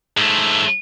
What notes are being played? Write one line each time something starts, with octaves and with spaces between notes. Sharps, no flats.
G#2 A3